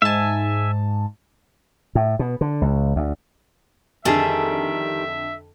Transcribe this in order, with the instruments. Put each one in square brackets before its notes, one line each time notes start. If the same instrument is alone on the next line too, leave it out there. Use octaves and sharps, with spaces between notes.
[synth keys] G#2 A5 [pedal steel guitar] E5 G#5
[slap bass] A2
B2
D3
C#2
D2
[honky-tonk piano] F2 D3 D4 [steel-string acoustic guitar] D#3 G3 [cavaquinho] G#4 A4 [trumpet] E5